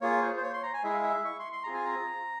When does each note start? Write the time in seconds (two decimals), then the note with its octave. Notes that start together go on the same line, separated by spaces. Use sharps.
0.01 A#3 F4 G#4 C#5
0.22 C5
0.37 C5
0.43 C#5
0.53 C6
0.63 A#5
0.74 G#5
0.84 G#3 E4 G#4 E5
0.94 F5
1.04 E5
1.25 C#6
1.39 C6
1.53 C6
1.63 C4 F4 G#4 A#5
1.74 G#5
1.84 A#5